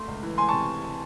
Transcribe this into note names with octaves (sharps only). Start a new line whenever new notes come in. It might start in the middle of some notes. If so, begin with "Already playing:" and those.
Already playing: A3 C6
C#2
E3
G#3 G#5 C6
C3 A5 C#6